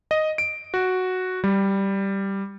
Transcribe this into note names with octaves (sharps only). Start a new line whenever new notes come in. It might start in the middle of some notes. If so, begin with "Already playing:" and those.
D#5
D7
F#4
G3